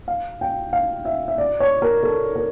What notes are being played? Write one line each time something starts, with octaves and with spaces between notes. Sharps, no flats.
F5
G5
F5
E5
E5
D5
C#5
A#4
A4
A#4